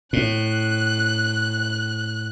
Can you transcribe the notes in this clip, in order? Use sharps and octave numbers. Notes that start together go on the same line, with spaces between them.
A2 F#6